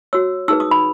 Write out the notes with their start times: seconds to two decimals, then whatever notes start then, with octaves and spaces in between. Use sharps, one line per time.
0.13 F#4 C#5 E6
0.48 D#4 G#4 B4 E6
0.60 D#6
0.71 B5